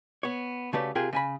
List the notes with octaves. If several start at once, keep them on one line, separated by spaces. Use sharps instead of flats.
B3 C#5
C#3 A3 F#4 G4 B4 D5
C3 F4 G#4 A#4 G5
C#3 G#5 B5